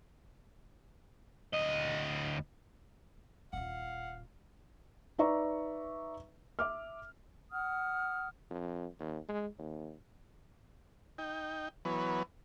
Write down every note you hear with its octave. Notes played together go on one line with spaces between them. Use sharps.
D2 D#5
D#1 F4 F5 F#5
D#4 B4 D5 E5 A#5 C#6
E5 D6 F6
F#5 D#6 F6
F2
D#2
G#3
D#2
D#4 G5
E3 F#3 B3 B4 C#5